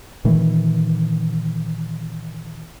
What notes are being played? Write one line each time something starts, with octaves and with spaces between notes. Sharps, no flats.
A#2 D#3 E3 A3